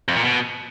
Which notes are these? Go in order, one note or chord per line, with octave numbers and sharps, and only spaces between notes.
F2
A#2
B2